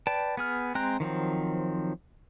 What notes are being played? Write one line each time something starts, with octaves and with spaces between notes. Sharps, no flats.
B4 D5 G5 A5
B3 G#4 F6
G#3 C4 G5 A#5 F#6
D#3 F3 F#3 C4